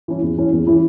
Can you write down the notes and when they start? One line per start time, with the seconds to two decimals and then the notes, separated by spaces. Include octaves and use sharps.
0.08 E3 C#4 E4
0.22 E2
0.37 E3 C#4 E4
0.52 E2
0.67 E3 C#4 E4